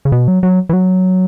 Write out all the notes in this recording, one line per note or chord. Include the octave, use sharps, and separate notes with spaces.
C#3
B2
F#3
F#3
E3
F#3